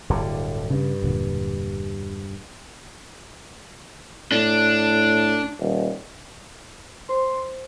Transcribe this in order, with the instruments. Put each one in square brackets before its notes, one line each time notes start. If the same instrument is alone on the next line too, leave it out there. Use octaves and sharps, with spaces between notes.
[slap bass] D1 G2 D3
[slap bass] G2 [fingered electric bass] C#3
[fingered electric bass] E1 A#2 D3
[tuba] A2 [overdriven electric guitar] D4
[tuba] D#1
[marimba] C5 [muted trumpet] C6